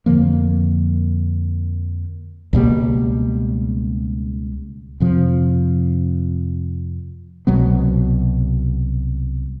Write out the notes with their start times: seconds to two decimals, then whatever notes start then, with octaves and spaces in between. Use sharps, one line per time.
0.06 F2 D3 F3 A#3
2.53 C#2 B2 G3 A#3
5.00 F2 C3 F3
7.47 C2 B2 F#3 B3